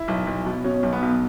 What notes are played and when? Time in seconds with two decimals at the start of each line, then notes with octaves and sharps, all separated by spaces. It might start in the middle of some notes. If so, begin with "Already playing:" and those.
Already playing: E4
0.08 B1
0.27 B1
0.46 B2
0.64 B2 C#4
0.83 B1
0.93 B3
1.02 B1